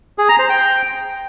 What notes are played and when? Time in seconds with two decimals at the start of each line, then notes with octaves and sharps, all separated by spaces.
0.18 G#4
0.29 A#5
0.39 C5
0.49 G5